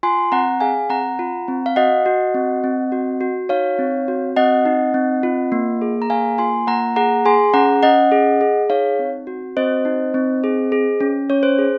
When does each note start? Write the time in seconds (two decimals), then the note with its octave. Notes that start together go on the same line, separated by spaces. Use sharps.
0.03 F4 G#5 C6
0.32 C4 F#5 A#5
0.61 G#4 F5 G#5
0.90 C4 F#5 A#5
1.19 F4
1.48 C4
1.66 F5
1.76 F#4 D#5 F#5
2.06 F#4
2.34 C4
2.64 C4
2.92 F#4
3.21 F#4
3.49 D#4 C#5 F5
3.79 C4
4.08 F#4
4.36 C4 D#5 F#5
4.66 D#4
4.94 C4
5.23 F4
5.52 A#3
5.82 G#4
6.02 A#5
6.10 A#3 F5 G#5
6.38 F4 G#5 C6
6.67 A#3 F#5 A#5
6.96 G#4 F#5 A#5
7.25 G#4 G#5 C6
7.54 C#4 F#5 A#5
7.83 C#4 D#5 F#5
8.12 G#4
8.41 G#4
8.70 D#4 C#5 F5
8.99 C4
9.27 F#4
9.57 C4 C5 D#5
9.85 D#4
10.14 C4
10.44 G#4
10.72 G#4
11.00 C#4
11.30 C#4 C#5
11.43 C5
11.58 G#4